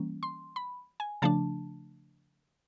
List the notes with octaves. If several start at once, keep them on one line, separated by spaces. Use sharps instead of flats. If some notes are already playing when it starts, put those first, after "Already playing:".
Already playing: E3 G3 A#3 C#4
C6
B5
G#5
C#3 F3 A3 D4 A5